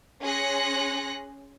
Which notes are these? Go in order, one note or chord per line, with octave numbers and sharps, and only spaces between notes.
C#4 G#4 C6 F#6 A#6 C#7